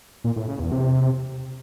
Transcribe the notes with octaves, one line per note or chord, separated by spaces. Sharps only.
A#2
A2
C#3
E2
C3